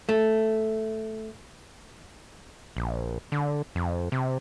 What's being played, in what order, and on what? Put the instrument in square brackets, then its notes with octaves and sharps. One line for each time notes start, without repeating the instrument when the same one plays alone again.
[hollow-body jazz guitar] A3
[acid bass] A#1
D3
F2
C3